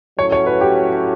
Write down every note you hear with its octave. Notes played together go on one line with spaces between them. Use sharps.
A2 F#3 A3 C#4 F#4 C#5
C#5
B4
G4